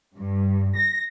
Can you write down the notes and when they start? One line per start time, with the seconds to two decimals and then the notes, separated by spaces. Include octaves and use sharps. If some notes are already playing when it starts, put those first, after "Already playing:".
0.17 G2
0.76 A#6